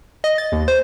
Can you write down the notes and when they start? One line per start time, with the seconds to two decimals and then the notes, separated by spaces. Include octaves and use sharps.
0.24 D#5
0.38 A6
0.52 D#2
0.68 C5